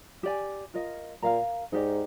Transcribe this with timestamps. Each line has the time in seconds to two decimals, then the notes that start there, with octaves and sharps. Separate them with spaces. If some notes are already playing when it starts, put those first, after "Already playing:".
0.23 G4 D5 G#5
0.74 F4 A#4 D#5
1.22 A#2 A#4 F5 A#5
1.72 G#2 D#4 G4 D5